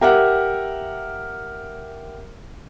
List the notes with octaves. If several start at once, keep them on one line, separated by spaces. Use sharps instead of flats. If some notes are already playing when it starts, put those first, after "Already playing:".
G4 A#4 E5 F#5